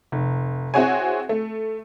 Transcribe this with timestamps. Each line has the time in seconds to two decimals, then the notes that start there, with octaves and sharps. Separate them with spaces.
0.12 F1
0.74 C4 E4 F#4 G#4 C#5 G#5
1.29 A3